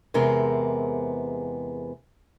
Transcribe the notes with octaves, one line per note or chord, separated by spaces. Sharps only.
E2 C3 G#3 B3 C4 A#4